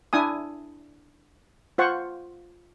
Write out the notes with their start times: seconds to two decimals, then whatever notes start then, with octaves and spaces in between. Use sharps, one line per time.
0.13 D4 E4 G#5 D#6
1.78 F4 C5 F#5 C#6